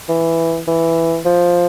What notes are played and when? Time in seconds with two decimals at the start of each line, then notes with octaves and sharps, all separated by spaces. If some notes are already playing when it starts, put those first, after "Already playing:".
0.09 E3
0.68 E3
1.25 F3